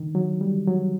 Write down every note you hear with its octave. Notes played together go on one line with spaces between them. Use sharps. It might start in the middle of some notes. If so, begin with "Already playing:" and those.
Already playing: D3 D#3
F#3
G3
F#3